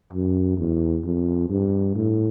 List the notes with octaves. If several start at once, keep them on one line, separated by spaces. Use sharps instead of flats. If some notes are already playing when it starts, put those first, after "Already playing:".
F#2
E2
F2
G2
A2